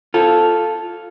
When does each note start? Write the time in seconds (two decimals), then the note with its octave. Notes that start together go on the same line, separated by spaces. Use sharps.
0.14 F4 A4